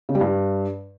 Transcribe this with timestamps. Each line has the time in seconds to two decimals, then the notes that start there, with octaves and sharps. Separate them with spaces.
0.09 C#3
0.15 G3
0.21 G2